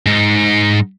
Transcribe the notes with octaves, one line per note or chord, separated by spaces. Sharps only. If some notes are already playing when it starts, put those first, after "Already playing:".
G#2 D#4